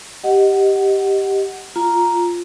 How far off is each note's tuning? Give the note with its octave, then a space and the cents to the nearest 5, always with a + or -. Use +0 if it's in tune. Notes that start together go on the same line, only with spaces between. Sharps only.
G4 +0 D#5 +0 F#5 +10
F4 +0 A#5 +5